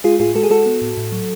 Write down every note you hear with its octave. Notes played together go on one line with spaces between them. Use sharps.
G#3 F4 G#4
A2 F4 G#4
G#3 F#4 A4
G#4
G#3 F#4 A4
B3
A2
A2
F#3